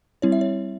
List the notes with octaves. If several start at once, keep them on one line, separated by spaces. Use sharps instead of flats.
G3 C4 E4 C#5
E5
C#5